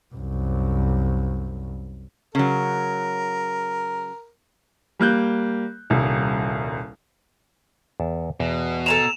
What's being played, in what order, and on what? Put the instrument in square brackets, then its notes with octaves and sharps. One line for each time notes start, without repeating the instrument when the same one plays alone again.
[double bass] C2 F#2
[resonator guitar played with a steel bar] C#3 F#3 [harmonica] A#4
[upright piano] G3 A#3 F#6 G6
D#1 C2
[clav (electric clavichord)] E2 A5
[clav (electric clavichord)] E2 [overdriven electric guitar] B2
[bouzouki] A4 G#5 A#5 [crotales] E7 F7